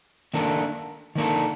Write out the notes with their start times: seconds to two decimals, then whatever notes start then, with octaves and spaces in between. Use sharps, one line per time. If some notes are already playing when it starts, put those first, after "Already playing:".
0.34 D#3 A#3 D4 A4
1.15 D#3 A#3 D4 A4